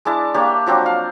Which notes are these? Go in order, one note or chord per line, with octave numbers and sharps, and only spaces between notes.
G#3 D4 E4 A5
A#3 D4 G4 C#5
F3 F#3 C4 D4
F5